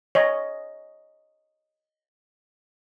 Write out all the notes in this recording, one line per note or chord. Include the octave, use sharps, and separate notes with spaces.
C#5 D#5